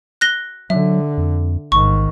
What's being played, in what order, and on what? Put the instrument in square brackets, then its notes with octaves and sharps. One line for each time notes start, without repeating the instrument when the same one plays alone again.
[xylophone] F#6 A#6 G7
[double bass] D3 [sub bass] F#3 [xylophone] E5
[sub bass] F2
[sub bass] A1 [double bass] G#2 D#3 [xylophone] C#6